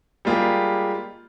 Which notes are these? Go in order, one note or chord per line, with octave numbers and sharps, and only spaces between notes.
G3 G#3 A#3 F4 G4 G#4